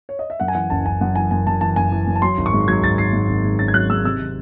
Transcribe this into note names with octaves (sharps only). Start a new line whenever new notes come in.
C#5
D#5
E5
F#2 F#5
G#5
E3 F#5
F#1 A5
F#1 G#5
F#2 F#5
E3 G#5
F#2 G#5
F#2 A5
E3 A5
F#2 G#5
E3
F#2
A5
F#3 C6
G#1
C#6
G#2
F#3 G#6
G#1 A6
G#1 C7
G#2
G#1
G#2
C#4 A6
G#6
F#3 F#6
G#2 E6
C3 E6
D#3